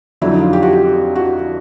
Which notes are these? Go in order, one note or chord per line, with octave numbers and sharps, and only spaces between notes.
F2 D3 F#3 E4
D#4
F4
G4
F#4
G4
F#4